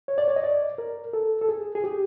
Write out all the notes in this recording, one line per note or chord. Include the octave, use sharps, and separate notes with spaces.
C#5
D5
C#5
D#5
D5
A#4
A4
A4
G#4
G#4
G4